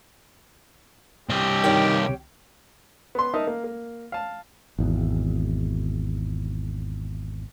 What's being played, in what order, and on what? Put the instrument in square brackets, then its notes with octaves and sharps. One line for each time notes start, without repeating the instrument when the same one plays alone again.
[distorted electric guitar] C2 D#5 [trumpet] G4
[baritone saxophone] D#3 [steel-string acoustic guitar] G3 C#5 G5
[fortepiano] B3 C6
D#4 A#4 E5 A5 D#6
A#3
A#3
F5 A5
[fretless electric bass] G#1 E2